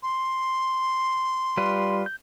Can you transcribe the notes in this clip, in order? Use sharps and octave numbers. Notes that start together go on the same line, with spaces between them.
C6
G3 F4 B4
G6